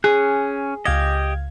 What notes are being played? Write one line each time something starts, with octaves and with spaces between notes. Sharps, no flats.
C#4 G#4 F#6
C#2 G4 D#5 F5 G#6